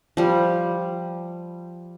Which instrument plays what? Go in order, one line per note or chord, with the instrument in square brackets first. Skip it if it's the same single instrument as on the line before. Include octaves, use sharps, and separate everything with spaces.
[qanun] F3 G3